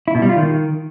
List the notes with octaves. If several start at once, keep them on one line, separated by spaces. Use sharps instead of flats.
E4
B2
G3
F4
D#3